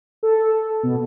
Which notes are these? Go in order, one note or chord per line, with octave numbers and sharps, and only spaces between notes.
A4
B2